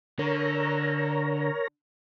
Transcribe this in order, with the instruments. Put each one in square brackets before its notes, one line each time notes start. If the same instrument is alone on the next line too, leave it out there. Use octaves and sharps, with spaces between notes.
[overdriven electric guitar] D3 [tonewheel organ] A#4 C#5 A#5